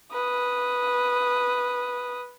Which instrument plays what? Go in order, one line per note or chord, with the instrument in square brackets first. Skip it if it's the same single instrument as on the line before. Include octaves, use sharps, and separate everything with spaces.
[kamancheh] B4 D#6